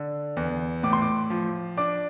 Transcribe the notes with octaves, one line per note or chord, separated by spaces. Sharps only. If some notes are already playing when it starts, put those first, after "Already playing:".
Already playing: D3
E2
A2 D6
C6
D6
F3
D4 D6